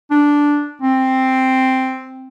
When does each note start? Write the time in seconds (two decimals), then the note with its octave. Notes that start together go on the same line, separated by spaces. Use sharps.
0.11 D4
0.82 C4